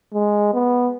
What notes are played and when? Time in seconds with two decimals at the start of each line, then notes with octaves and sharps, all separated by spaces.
0.14 G#3
0.54 B3